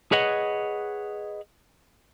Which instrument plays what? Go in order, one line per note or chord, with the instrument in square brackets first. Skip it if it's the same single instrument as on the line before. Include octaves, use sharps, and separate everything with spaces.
[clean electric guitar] G#4 B4 C#5 D#5 F#5